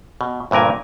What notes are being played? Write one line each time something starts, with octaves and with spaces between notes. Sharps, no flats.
B2
D2 G2 A#2 A#4 G#5